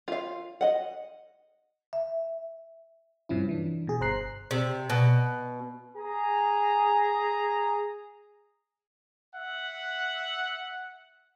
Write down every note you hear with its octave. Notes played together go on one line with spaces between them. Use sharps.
F4 F5
D#5 F#5
E5
G2 C3 F3 C#4 E4
E3 D4
B2 G#4
G1 C5 A#5 F#6 C7
C3
B2
G#4 A#5
E5 F#5